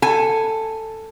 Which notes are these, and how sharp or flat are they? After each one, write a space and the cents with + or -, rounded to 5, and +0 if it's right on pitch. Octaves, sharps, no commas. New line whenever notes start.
A4 +10 G#5 +0